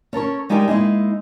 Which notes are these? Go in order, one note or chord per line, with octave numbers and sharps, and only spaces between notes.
C#4 A4 A#4 C#5
G3 G#3 D#4 G4 A#4 G#5
G#3 A#3 D#4 E4